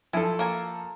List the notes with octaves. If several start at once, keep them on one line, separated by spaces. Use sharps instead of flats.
F3 E4 A4 G#5
A#3 A#4 G#5